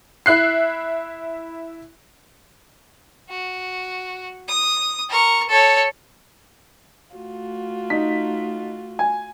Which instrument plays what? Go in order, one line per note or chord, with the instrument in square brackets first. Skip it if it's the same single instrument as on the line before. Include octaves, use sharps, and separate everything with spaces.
[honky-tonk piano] E4 E5 F#6 C7
[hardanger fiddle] F#4
D#6
A#4 C#6
A4 C#5
[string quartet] A3 F4 F#4
[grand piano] D#4 B6
G#5